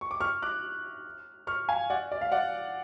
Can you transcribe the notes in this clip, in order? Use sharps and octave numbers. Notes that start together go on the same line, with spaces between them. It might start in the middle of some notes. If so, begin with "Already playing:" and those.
C#6
D6
C#6 F6
D6 F#6
C#6 F6
F5 G#5
D5 F#5
D5
F5
D5 F#5